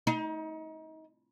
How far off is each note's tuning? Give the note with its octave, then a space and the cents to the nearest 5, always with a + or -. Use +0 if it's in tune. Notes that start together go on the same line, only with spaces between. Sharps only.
D#4 +30